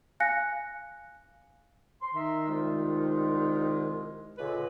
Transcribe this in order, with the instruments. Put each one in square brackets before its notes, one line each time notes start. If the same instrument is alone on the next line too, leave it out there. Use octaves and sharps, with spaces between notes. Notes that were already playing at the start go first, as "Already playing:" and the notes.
[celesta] F5 G#5 F#6 A#6 C#7
[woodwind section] C6
[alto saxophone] D#3 [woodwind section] A#4 E5 C6
[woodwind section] C2 G#3 F4
[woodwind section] C#2 A#2 D3 [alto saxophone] B4